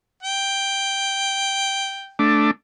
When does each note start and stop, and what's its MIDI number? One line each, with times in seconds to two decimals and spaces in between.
0.23 2.18 79
2.19 2.51 57
2.19 2.51 62